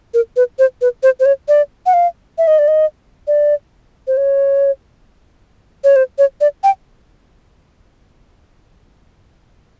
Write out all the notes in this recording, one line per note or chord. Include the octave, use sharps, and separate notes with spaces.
A#4
B4
C5
B4
C5
C5
C#5
D5
F#5
F5
E5
D#5
D5
D#5
D5
C5
C#5
C#5
C5
C#5
D5
G5